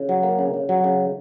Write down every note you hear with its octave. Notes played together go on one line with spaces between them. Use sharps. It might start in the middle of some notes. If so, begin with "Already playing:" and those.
Already playing: C#3
F#3
A#3
C#3
C#3
F#3
C#3